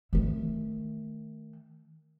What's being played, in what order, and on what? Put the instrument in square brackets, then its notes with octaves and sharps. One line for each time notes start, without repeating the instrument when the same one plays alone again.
[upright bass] D#3 A3